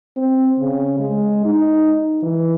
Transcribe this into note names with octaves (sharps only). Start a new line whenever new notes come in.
C4
C#3
G#3
D#4
E3